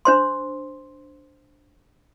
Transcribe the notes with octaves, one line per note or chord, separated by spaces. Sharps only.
D4 C5 C6